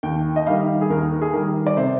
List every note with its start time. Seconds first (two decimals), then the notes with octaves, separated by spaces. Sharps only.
0.03 D#2 G5
0.36 D#5
0.47 D#3 G3 F5
0.81 G#4
0.90 D#2 A#4
1.22 G#4
1.33 D#3 G3 A#4
1.67 D5
1.77 C3 C5